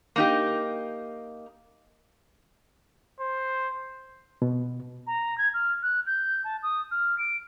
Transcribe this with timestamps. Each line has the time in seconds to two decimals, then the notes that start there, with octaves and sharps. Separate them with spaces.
0.16 A#3 D#4 G4
3.21 C5
4.42 B2
5.07 A#5
5.38 G#6
5.54 F6
5.83 F#6
6.07 G6
6.44 A5
6.63 D#6
6.91 F6
7.19 D7